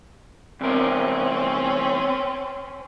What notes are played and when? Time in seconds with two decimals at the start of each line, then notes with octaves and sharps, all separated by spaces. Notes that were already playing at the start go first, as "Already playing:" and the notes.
0.61 E2 C3 C4 C#4 A#4